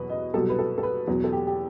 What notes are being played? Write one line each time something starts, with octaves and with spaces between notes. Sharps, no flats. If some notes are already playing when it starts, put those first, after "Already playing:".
Already playing: E2 B2 F#3 B4
D#5
C2 B2 F#3 A4
B4
A4
A4
B4
E2 B2 F#3
A4
G4
G4